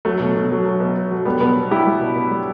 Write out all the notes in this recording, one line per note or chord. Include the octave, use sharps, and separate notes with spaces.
F#3 A3
B2
B2
F#3
F#3
B2
B2
F#3
G3 B3
B2 B3
B2
G3 E4 G4
G3
B2
B2
G3